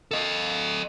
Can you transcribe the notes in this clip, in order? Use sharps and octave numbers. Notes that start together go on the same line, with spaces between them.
A4 D#5